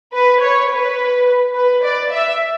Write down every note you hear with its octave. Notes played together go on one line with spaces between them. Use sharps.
B4
C#5
B4
B4
D5
E5